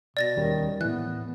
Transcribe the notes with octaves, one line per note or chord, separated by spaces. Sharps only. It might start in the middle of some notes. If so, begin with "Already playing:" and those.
B2 D5 A6 A#6
D#2 D#3 G3 C#4
A2 E3 B3 F#6